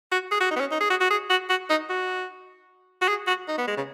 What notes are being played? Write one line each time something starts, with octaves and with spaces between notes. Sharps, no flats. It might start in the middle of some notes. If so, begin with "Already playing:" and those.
F#4
G#4
F#4
D#4
B3
C#4
D#4
G#4
F#4
F#4
G#4
F#4
F#4
D#4
F#4
F#4
G#4
F#4
D#4
B3
G#3
C#3